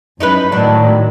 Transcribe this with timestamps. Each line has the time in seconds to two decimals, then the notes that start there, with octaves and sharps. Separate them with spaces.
0.20 F#2 D#4 E4 B4 B5
0.52 A2 D#3 F#3 D4